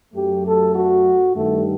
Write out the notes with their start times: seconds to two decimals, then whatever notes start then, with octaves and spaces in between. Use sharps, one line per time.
0.14 F#2 F#3 A3 G4
0.45 A4
0.75 F#4
1.35 G2 D#3 G3 A3